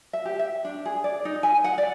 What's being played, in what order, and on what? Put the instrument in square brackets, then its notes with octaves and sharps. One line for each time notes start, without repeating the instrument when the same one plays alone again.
[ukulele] E5
G4
E5
D4
G#4
D5
D#4
G#5
F#5
D5